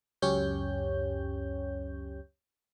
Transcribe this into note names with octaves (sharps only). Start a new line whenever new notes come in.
C#2 F#2 C#4 G4 C#5 G6